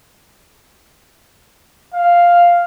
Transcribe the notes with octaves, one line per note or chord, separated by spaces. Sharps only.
F5